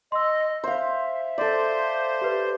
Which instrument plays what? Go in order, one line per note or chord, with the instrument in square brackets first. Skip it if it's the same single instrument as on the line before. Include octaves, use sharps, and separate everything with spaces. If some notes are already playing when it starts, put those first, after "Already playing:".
[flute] D#5 [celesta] C6 E6
[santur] C5 F5 [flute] E5
[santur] A4 D5 [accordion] C5
[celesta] G4 B4